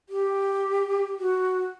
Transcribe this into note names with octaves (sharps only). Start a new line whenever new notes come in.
G4
F#4